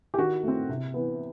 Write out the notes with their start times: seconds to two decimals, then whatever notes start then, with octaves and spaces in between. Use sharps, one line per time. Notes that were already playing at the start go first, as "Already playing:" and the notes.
0.14 G4
0.18 D#3 F#4
0.43 A3 C4
0.69 C3
0.94 E3 B3